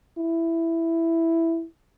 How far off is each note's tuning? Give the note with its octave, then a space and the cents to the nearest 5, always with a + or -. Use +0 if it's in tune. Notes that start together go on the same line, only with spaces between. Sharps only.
E4 +5